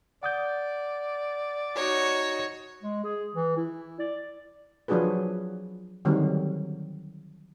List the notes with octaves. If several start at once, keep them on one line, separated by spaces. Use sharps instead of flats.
D5 F#5 D#6 G6
D#4 F#4 C#5
G#3
G#4
E3
E4
D5
F3 F#3 D4 F#4 G#4 B4
D3 D#3 F#3 G3 C4